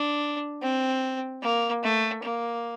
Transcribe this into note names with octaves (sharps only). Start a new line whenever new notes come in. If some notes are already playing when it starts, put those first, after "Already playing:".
Already playing: D4
C4
A#3
A3
A#3